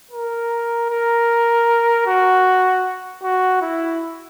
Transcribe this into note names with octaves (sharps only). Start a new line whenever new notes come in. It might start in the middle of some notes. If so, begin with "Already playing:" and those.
A#4
A#4
F#4
F#4
E4